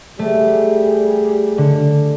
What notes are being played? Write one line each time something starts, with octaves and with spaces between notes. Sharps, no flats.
G3 A3 G4 G#4
D3